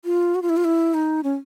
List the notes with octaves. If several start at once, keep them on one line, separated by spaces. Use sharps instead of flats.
F4
F#4
F4
E4
F4
E4
D#4
C#4